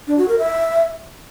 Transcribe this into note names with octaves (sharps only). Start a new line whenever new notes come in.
D4
F#4
A#4
E5